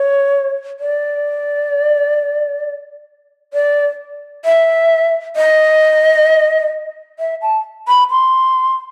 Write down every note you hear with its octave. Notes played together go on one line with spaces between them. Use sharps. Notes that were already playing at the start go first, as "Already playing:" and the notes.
Already playing: C#5
D5
D5
E5
D#5
E5
A5
B5
C6